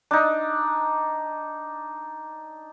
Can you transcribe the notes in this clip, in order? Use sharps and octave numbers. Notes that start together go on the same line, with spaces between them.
D4 D#4